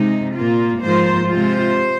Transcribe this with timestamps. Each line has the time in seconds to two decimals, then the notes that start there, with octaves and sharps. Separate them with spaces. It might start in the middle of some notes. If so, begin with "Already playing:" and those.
Already playing: C3 G#3 D#4
0.34 A#2 A#3 F4
0.80 G#2 F3 A#3 F4 C5
1.26 C3 G#3 F4 C5